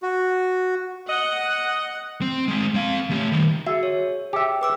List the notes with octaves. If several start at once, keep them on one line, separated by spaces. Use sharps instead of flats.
F#4
D#5 F#5
C4
G#3 C4
C4 F5
A3 G4
D#3 G3
F#4 G#4 E5
C#5
G4 G#4 E5
B4 D6 E6